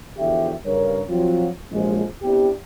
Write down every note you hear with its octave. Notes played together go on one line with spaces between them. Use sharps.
E2 D3 F3 F#4 G4 E5
G2 C#3 A#4 C#5
F3 F#3 C4 F4
A#1 C3 F3 F#3 G#3
B3 C4 D4 E4 G4